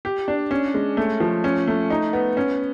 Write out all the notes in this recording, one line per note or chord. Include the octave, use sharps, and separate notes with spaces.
G4
D4
C#4
G#3
A3
F3
C#4
A3
D#4
B3
C#4